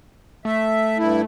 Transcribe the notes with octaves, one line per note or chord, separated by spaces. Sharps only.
A3 E5
G2 E4